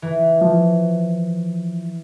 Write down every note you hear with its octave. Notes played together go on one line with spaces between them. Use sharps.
E3
F3